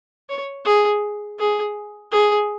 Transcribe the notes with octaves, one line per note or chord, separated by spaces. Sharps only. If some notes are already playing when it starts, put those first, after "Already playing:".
C#5
G#4
G#4
G#4